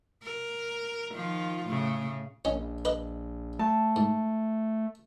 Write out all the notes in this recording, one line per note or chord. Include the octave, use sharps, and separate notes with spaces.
A#4
D#3 F3 F4
A2 C#3
A#1 C#4 D#5
B4 D#5
A3 A5
G#2